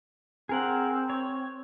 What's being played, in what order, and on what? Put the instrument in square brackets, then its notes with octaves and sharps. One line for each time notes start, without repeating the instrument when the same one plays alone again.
[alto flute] C4 [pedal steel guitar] G#4 A#4 F#5
[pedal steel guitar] C#5